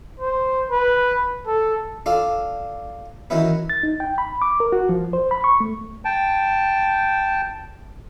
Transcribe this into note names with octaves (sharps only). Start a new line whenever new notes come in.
C5
B4
A4
D4 F4 A4 D5 A5
D#3 E3 F#3 C#4 E4 B4
A6
D#4
G5
B5
D6
A#4
F#4
F3
C5
B5
C#6
A3
G5 A5